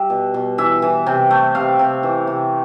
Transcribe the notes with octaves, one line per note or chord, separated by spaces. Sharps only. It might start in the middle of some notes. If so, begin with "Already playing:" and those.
Already playing: G3 E5
B2
B2
E3 E5
E3
C3
A3
C3 F5
C3
E3
C3